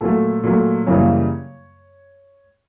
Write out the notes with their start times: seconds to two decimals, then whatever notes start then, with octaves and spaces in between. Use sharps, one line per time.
0.01 A#2 F#3 A3 A4
0.44 A#2 F#3 A3
0.87 F#2 C#3 E3 G3 A#3 C#5